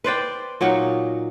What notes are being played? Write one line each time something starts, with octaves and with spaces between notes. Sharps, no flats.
B4 C5 D5 G5
A#2 F#3 D#4 F#5